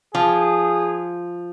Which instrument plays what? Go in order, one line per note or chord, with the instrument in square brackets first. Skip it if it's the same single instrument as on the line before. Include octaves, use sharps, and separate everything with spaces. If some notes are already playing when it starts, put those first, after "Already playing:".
[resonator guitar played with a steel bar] F3 [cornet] G#4